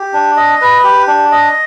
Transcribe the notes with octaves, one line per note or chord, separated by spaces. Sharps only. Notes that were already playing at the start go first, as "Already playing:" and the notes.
Already playing: G4
D4
D#5
B4
G4
D4
D#5